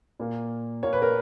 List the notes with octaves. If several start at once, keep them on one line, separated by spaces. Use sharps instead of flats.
A#2 A#3
A#2 A#3 C#5
B4
A#4